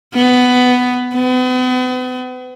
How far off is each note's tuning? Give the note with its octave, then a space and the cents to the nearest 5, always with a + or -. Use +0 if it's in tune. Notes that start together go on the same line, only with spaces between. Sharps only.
B3 +10
B3 +40